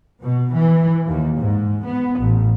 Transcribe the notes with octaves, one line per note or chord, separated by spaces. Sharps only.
B2
E3
D#2
G#2
B3
A1